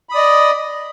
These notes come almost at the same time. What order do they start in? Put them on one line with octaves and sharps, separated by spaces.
B5 D#6 D5 D#5